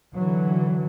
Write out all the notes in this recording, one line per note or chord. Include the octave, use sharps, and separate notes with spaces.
D3 E3 F#3